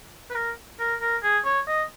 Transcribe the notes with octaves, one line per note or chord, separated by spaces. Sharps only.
B4
A#4
A#4
A#4
G#4
C#5
D#5